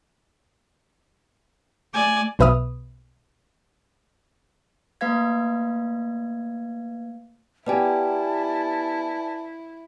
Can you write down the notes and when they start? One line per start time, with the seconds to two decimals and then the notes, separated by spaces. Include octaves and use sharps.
1.94 A3 D5 G#5
2.39 B1 B2 B4 E5 D#6 F6
5.01 A3 A#3 B4 F5 G#6
7.66 B3 E4 G4 B4 D5 G#5 A5